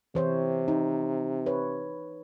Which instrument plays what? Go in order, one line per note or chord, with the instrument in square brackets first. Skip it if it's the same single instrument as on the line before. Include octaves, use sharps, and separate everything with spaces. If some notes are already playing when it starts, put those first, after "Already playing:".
[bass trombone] C3 [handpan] E3 C5 C#5
[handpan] D#4
B4 C#5